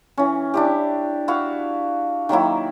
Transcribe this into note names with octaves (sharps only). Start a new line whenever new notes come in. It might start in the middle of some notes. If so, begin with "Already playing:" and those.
E3 C#4
D4 E4 G4
E4 F#4 F5
D#3 F#3 A#3 E4